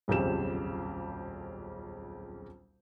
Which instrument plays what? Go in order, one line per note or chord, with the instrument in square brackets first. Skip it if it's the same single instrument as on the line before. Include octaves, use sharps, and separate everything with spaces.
[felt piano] D#1 B1 F2 C#3 G4 E7